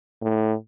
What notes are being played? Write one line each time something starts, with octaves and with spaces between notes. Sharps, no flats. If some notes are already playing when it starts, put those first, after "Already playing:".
A2